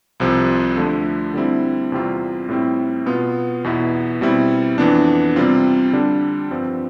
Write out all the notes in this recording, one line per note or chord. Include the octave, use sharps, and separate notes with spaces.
C2 C3 F3
D3 F3 A3
D3 G3 C4 E4
E2 C3 G3 C4 F4
A2 G3 C4 E4
B2 B3 F4
E2 B2 B3 E4
B2 G3 C4 E4
F2 E3 B3 D4
C3 G3 C4 F4
D3 G3 D4
G2 F3 C4